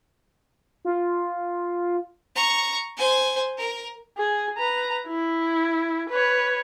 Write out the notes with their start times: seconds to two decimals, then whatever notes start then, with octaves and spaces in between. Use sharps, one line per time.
0.85 F4
2.35 A#5 C#6
2.97 C5 G#5
3.57 A#4
4.18 G#4
4.58 B4 A#5
5.08 E4
6.09 B4 C#5